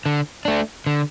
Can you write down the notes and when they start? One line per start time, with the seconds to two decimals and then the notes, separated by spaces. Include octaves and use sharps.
0.06 D3
0.45 A3 D4
0.86 D3